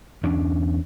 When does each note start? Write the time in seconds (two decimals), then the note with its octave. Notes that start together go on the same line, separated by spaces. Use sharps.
0.23 E2 C#4 D4